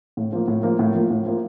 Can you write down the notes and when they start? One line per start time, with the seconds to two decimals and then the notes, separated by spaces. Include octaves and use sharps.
0.17 A2
0.32 F3 A#3
0.48 A2
0.63 F3 A#3
0.79 A2
0.95 F3 A#3
1.10 A2
1.26 F3 A#3